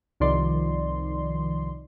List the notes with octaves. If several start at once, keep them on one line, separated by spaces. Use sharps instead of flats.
C2 D#3 F3 D5 C6